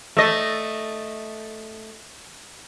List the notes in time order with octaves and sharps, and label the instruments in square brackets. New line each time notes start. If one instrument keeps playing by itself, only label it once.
[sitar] A3 D#5